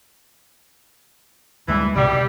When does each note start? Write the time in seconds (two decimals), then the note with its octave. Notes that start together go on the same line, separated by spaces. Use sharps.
1.68 D2 E3 G3 G#3
1.96 C2 B2 G3